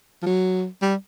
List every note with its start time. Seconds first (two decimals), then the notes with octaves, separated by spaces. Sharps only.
0.22 F3
0.26 F#3
0.82 G3